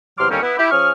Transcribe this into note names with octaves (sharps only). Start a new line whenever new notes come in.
E2 C3 F#3 C6 D6 F6
D#2 D3 G3 A#3 C4 C#4
B3 E4
E4 G4
F3 C#4 G#4 C#6 F6